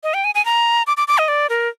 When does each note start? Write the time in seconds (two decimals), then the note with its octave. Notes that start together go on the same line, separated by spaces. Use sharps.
0.03 D#5
0.14 G5
0.24 G#5
0.35 G#5
0.45 A#5
0.87 D6
0.97 D6
1.08 D6
1.18 D#5
1.28 D5
1.50 A#4